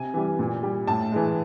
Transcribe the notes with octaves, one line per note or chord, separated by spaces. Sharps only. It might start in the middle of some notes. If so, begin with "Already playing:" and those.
Already playing: C3 G#5
E3 G3
A#2
G3
A2 A5
E3 G#3